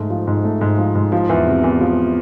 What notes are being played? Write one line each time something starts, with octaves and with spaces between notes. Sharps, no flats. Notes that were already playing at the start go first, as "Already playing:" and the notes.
Already playing: G#2 A3
F3
G#2
A3
G#2
F3
G#2
F3
E2
C3
E2
F3